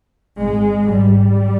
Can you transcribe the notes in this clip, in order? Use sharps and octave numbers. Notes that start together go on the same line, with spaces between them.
G#1 G#2 G#3
G#1 G#2 G3